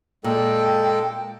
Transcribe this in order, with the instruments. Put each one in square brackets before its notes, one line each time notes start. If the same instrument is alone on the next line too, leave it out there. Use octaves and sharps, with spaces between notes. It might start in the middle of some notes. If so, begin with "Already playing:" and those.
[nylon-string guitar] A#2 [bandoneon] G#3 A4 [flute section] G5